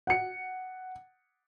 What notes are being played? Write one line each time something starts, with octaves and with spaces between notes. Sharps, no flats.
F#5 C#7